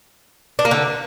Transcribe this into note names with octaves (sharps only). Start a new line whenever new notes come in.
D4
A#3
D3